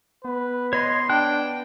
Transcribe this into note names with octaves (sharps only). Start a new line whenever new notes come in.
B3 B4
C#5 D#5 C6
D4 G5 A5 F#6